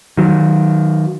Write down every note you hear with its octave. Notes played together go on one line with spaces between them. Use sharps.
D#3 F#3